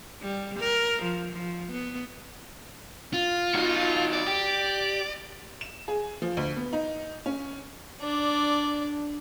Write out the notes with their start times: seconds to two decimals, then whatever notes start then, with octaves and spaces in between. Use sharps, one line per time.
0.22 G3
0.60 A#4
1.03 F3
1.32 F3
1.72 B3
3.13 F4
3.55 D#4 F#4
4.13 D5
4.27 G4
5.61 E7
5.88 G#4
6.22 F3
6.37 D2
6.56 B3
6.73 D#4
7.26 C#4
8.01 D4 D5